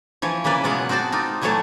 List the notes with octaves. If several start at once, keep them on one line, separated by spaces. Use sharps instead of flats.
E3 F3 C#5
C#3 E3 A#3 B4 D5
B2 F#3 G#3 F4 F#5
C4 F#4 C5 D5 A5
D#4 F4 D5
A#2 E3 F#3 A3 C#5 A5